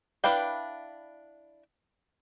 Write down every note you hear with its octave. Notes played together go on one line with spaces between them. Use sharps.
D4 E4 B4 F5 G5